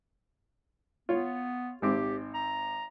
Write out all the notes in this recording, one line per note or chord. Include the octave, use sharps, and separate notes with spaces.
B3 F4 C#5
G#1 C4 G4 D6
A#5